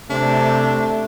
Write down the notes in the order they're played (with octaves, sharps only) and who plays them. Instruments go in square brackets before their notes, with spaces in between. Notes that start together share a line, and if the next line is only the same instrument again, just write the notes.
[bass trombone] C3 [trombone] A3 [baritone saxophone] D4